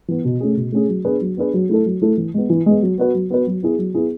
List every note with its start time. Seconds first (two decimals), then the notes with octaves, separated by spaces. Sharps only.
0.08 E3 B3
0.24 B2
0.41 A3 C#4 G#4
0.57 B2
0.72 A3 C#4 G#4
0.89 F#3
1.05 B3 D4 G#4 B4
1.21 F#3
1.37 B3 D4 G#4 B4
1.54 F#3
1.69 A3 E4 A4
1.86 F#3
2.02 A3 E4 A4
2.17 E3
2.34 G#3 B3
2.50 E3
2.66 G#3 B3
2.82 F#3
2.98 B3 F#4 B4
3.14 F#3
3.30 B3 F#4 B4
3.47 F#3
3.63 B3 E4 G#4
3.78 F#3
3.94 B3 E4 G#4